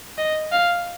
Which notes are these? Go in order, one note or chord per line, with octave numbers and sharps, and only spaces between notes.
D#5
F5